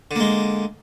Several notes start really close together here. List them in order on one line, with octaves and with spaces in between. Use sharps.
D3 A#3 G#3